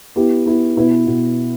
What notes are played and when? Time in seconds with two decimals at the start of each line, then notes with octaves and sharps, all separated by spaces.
0.16 B3 E4 G4
0.46 B3 E4 G4
0.77 B2 B3 E4 B4
1.07 B2